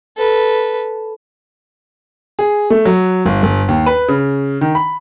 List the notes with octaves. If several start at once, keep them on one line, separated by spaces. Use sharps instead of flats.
A4 B4
G#4
A3
F#3
G1
G1
D#2
B4
C#3
D#3
B5